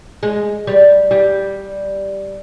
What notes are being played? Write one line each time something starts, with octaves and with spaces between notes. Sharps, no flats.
G#3
G3
G3